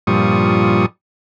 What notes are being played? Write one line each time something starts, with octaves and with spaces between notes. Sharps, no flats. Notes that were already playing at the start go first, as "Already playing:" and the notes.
G2 A#2 F3 G3 C#6 D#6